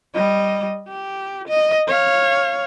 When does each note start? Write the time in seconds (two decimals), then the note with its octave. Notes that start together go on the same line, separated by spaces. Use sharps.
0.15 G3 D#5
0.88 G4
1.48 D#5
1.88 C#5 F5